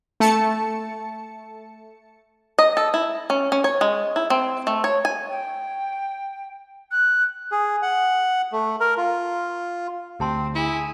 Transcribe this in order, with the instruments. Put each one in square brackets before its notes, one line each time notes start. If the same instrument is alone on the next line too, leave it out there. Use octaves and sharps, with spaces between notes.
[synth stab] A3 A5 C#7
[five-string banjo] D#5
A4
E4
C#4
C#4
C#5
G#3
E4
C4
A3
C#5
G#5
[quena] G5
F#6
[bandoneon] G#4
F#5
A3
A#4
F4
[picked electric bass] D2 [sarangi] C4 [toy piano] G4 A5 C6
[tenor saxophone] E4 [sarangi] G#4